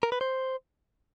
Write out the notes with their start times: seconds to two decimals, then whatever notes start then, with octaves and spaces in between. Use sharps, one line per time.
0.03 A#4
0.12 B4
0.21 C5